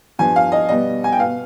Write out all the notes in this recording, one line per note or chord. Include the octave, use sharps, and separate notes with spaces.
G2 F3 B3 G#5
F5
D#5
B2 G3 B3 D#5
G#5
G5
B2 B3 F5